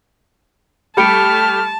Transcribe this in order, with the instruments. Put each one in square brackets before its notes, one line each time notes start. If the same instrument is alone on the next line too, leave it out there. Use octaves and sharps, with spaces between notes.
[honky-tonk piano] G3 A3 G4 [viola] A5 [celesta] B5 C#7 D7 [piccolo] F6